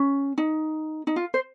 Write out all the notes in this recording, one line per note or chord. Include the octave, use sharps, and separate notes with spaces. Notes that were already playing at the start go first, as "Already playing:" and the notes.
Already playing: C#4
D#4
D#4
F4
C5